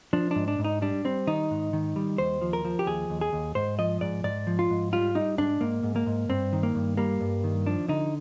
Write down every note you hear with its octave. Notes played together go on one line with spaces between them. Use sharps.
F3 D4
G#2 D4
D4
G#2
D#4
G3 D4
G3 C4
D#3 D#4
G#2
D#3
G3
D#2 C5
F3
A#4
F3
G4
D#2 G#4
D#2
G#4
D#2
G#2 C5
F3 D#5
G#2 D5
G#2 D5
F3
F4
G#2
G3 F4
G3 D#4
G#2 D4
G#2 A#3
G#2
A#3
G#2
G2 C4
D#3
A#3
G2
G3 A#3
G2
D#3
F3 D4
D3 D#4